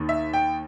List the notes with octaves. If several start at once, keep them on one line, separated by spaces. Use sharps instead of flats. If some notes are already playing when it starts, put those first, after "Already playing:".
Already playing: D#2 D#3
E5
G5